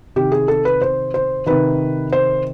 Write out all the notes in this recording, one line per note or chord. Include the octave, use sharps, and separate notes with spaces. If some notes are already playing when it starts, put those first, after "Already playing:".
C3 D#3 G4
G#4
A4
B4
C5
C5
C3 D#3 B4
C5